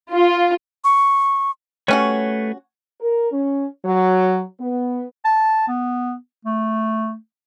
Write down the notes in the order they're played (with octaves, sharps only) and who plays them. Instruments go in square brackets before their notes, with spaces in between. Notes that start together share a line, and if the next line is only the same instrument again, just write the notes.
[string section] F4
[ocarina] C#6
[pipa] G3 C#4 F#4 [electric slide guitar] A3 B4 C#5
[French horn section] A#4
C#4
F#3
B3
[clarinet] A5
B3
A3